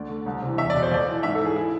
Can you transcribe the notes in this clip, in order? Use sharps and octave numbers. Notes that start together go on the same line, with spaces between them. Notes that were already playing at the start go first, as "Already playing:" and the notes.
Already playing: D2 D5
D3
C2
C3 E3
E2 E5
B2 D5
C5
F2 D5
E3
G#2 E5
E3 A4
G#4
E4